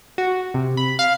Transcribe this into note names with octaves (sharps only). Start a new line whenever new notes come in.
F#4
C3
B5
F5